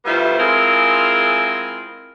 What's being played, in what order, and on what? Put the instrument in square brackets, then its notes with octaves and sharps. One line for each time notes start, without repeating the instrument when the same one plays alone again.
[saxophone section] D2 G3 B3 E4 F4 C5
G#3 C4 E4 F4 G#4 A#4